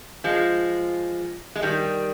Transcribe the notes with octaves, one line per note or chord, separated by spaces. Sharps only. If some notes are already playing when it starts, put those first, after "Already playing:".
F3 G#3
G#3
D#3 G3